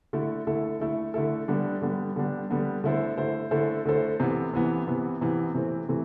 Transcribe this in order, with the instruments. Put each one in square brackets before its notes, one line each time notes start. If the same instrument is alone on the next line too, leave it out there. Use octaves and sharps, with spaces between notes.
[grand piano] D3 A3 E4 A4
D3 A3 E4 A4
D3 A3 E4 A4
D3 A3 E4 A4
D3 G3 B3 D4
D3 G3 B3 D4
D3 G3 B3 D4
D3 G3 B3 D4
D3 A3 E4 A4 C5
D3 A3 E4 A4 C5
D3 A3 E4 A4 C5
D3 A3 E4 A4 C5
C3 E3 B3
C3 E3 B3
C3 E3 B3
C3 E3 B3
C3 E3 A3 C4
C3 E3 A3 C4